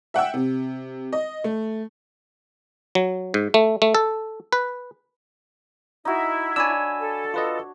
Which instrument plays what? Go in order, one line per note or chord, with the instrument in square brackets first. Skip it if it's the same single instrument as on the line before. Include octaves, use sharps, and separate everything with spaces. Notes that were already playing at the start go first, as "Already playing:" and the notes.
[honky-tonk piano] E5 F#5 G5 E6
C3
D#5
A3
[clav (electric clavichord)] F#3
G#2
A3
A3
A4
B4
[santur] D#4 F#4 [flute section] E4
[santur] D4 C#5 [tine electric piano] G#5 B5 E6
[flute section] A4
[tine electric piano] F4 B4 D#5